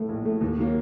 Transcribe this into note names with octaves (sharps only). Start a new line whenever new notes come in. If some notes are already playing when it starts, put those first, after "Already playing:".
Already playing: A2 A3
A#1
A2 A3
D#2
D#3 F#3 A#3